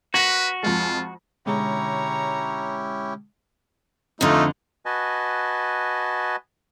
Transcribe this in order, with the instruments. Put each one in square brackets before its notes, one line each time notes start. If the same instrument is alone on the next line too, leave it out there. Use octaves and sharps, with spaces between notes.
[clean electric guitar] F#4 [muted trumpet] B4 [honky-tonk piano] A#6
[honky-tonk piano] F2 G#3 [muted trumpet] F4
[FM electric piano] B2 D3 G#3 [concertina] C#4 E4 G4 [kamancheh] C#5 A#5
[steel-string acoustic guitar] F2 D3 [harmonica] A3 D#4 F4
[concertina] F#4 B4 D#5 G#5 A5